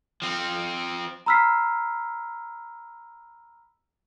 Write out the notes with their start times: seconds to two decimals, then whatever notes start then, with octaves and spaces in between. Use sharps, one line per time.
0.22 F3 C4
1.26 A#5 B5 E6 F6 B6 C7